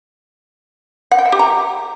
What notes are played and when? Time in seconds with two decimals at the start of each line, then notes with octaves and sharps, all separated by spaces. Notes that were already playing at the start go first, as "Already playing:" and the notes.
1.12 F#5
1.18 G5
1.25 E5
1.32 G4
1.39 A#5